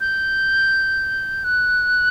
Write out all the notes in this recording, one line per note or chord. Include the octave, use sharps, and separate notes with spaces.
G6
F#6